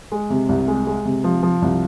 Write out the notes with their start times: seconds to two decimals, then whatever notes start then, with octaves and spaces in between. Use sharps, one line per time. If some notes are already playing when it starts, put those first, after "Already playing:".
0.12 G#3
0.30 C3
0.49 C2
0.68 G#3
0.87 G#3
1.05 C3
1.24 F3
1.43 F3
1.62 C2